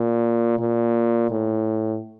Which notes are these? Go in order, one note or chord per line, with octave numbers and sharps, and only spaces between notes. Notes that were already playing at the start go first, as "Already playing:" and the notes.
Already playing: A#2
A#2
A2